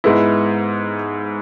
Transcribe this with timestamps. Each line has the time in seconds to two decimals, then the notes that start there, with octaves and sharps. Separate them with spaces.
0.04 G#2 G#3 B3 E4